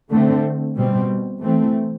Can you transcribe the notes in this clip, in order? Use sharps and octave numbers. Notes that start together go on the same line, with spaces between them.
D3 A3 C4
B2 G3 C4
E3 A3 C4